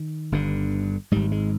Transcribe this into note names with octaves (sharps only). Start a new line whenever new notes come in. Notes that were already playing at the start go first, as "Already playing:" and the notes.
Already playing: D#3
G1 G2 D3
G#1 G#2 G3
G#3